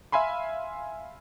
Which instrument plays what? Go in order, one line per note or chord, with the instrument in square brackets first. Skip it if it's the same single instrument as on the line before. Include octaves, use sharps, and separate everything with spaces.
[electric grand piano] E5 F5 G#5 B5 C6